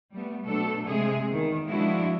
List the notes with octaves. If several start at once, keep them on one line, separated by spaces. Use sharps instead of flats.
G3 A3 B3
B2 F#3 A3 D4 A4
C3 G#3 G#4
E2 D#3
F3 G#3 D4 E4 F#4